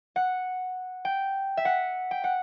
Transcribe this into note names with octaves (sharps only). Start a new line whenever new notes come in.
F#5
G5
E5
F#5
G5
F#5